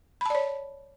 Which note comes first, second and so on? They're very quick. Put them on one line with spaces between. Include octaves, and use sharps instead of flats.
B5 A5 D5 C#5